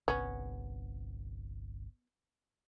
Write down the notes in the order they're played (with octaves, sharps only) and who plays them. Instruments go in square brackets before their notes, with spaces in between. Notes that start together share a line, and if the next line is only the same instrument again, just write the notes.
[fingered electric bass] G1 C2 [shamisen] B3 C#4